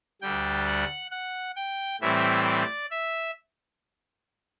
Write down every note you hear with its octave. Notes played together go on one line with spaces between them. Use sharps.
D2 D3 G3 G5
F#5
F#5
G5
A2 E3 G3 C4 E5
D5
E5